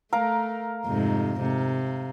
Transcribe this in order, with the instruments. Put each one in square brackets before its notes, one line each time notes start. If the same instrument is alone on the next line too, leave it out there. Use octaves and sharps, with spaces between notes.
[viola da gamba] A3 [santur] A#4 F5 A#5
[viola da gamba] F2 G#2 C3
C3